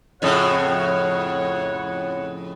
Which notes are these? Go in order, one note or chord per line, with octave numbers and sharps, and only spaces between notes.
F2 A2 C#3 C#5 F#5